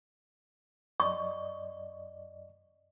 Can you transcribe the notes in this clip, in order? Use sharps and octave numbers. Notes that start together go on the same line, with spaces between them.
F#2 D5 D#5 C#6